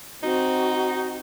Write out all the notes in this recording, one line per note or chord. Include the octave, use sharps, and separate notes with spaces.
C4 D#4 F#4